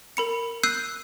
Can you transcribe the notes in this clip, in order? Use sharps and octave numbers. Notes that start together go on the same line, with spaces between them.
A#4 B5 C#7
E6 F#6 G6 C7 D#7